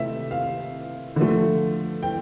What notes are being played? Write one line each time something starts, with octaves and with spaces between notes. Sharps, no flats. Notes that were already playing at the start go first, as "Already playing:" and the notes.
Already playing: C3 A3 E5
F5
D3 F3 A3
G5